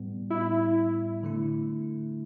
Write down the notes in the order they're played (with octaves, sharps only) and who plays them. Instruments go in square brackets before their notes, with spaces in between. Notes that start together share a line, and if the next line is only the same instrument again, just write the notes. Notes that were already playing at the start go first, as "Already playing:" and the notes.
Already playing: [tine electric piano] A2 G3 B3
[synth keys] E4
[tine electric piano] D3 A3 E4